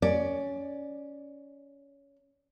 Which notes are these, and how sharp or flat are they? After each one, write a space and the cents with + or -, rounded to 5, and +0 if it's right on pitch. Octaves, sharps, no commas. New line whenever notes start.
C#4 +15 D5 +10